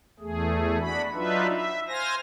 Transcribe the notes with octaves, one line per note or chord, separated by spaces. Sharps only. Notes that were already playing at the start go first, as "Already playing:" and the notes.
E2 A3 G#4
D4 F#4 B5
F#3 D4 D#4 F4 B4 E5
E5
C5 F5 G#5 A#6